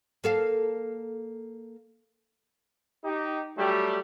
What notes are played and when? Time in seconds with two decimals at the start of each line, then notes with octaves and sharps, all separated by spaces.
0.24 A#3 A4 F5
3.05 D#4 G4
3.58 F#3 G3 A3 G4